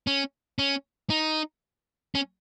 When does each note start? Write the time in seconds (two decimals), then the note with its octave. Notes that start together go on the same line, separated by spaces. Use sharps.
0.07 C#4
0.59 C#4
1.10 D#4
2.15 C#4